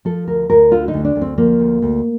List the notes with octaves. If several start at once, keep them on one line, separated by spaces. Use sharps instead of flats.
F3 A4
D2 A#4
D2 A#4
D3 F4
D#4
D2
D4
D2
C4
F3 A#3
D2
D2